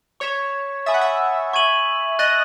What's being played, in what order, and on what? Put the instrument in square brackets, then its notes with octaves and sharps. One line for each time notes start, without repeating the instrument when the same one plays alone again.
[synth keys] C#5 [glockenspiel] C#6 G#6 B6 E7
[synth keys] E5 [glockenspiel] G#5 B5 D#6 A6
[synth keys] F#5
E5
[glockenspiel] C#6 G#6 D#7 F#7
[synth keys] D#5 [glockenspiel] F#6 A6 D#7 F#7